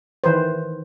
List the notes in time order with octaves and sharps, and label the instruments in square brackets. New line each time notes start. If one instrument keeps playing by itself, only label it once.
[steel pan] D#3 E3 B4 C5